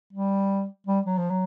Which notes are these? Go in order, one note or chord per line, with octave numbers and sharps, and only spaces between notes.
G3
G3
F#3
F3
F#3